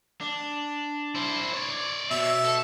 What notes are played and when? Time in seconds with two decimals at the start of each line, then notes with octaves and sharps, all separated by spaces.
0.21 D4
1.15 E4 C5
1.53 C#5 D5
2.11 B2 E5
2.45 A4